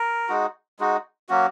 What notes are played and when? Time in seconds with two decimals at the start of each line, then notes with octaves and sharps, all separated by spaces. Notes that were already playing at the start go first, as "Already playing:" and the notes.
Already playing: A#4
0.28 G#3 D#4 F#4
0.80 G#3 D#4 F#4
1.29 F#3 A#3 C#4 F#4